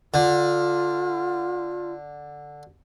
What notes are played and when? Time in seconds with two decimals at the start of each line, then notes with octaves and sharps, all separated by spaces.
0.14 D3 F4